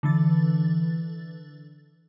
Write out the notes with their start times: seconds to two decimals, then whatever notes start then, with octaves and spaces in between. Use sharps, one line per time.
0.03 D3 E3 A6